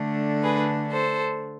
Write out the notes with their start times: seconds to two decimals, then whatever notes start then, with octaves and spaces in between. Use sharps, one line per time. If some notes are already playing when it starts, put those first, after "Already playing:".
Already playing: D3 A3 D4
0.44 G#4 B4
0.92 A4 C5